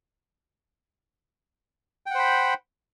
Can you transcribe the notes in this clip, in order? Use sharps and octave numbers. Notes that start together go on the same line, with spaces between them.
C5 F#5 G5 B5